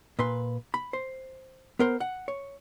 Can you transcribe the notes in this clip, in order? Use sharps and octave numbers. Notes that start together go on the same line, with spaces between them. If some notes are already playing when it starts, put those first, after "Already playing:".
A#2 B4 C6
B5
C5
B3 A#4 C5
F#5
C#5